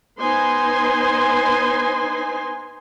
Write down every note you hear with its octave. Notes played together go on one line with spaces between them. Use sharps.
B3 D#4 C5 G#5 C6